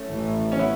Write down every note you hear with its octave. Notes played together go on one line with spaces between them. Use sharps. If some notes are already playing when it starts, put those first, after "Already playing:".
Already playing: A3 C#4
A1 A2 E3
C#4
B3 E4